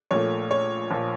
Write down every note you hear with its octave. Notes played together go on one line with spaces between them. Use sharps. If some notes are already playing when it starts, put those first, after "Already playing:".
A#1 A#2 A3 C#5
C#5
A#1 A#2 F3